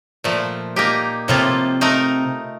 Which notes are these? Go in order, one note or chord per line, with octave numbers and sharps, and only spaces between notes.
A#2 F3 A3
A#3 D#4 G4
A2 C3 F3 A#3 F4 A4
A3 D#4 A#4